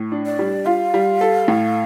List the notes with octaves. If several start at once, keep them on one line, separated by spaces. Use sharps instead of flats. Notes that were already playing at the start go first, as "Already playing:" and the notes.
Already playing: A2
D4
D5
G3
F4 F5
G3
A4
A2